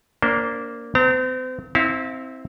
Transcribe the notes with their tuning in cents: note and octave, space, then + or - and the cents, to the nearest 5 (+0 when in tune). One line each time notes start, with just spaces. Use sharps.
A#3 +0 D4 -25 C5 +0
C4 -40 A#5 -30
C4 +0 E4 -30 F5 +0